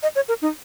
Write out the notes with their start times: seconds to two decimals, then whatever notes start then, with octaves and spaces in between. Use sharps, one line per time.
0.03 D#5
0.16 C#5
0.29 A#4
0.42 D#4